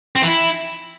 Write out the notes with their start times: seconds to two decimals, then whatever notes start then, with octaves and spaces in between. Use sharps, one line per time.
0.16 C4
0.22 E3
0.28 E4